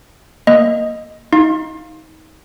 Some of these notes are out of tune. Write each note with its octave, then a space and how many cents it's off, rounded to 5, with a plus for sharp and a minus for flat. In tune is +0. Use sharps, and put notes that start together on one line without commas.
A#3 +0 D#5 +0
D#4 +30 F5 +5 C6 +35